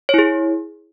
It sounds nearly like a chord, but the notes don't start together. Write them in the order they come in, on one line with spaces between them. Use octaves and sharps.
C#5 E4 G#4